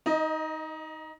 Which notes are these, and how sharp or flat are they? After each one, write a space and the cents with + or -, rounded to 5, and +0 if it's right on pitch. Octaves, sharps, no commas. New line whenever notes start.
D#4 +20 D#5 -10